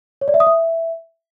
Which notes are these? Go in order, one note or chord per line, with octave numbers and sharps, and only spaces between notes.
C#5
D5
E5
D#6
E5